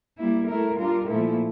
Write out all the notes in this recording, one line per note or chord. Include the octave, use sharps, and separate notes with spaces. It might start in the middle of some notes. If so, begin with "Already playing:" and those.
G3 A#3 E4
A3 E4 A#4
G3 D4 F4 A#4
A#2 F3 A3 E4